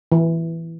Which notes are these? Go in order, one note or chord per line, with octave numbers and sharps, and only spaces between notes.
E3